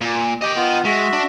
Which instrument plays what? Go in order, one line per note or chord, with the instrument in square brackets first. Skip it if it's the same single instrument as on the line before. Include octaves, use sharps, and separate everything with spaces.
[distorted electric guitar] A#2
[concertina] G4 [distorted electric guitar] D#5 G5
[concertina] B3 F4
[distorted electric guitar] G#3 [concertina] F#4 E5
[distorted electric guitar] D4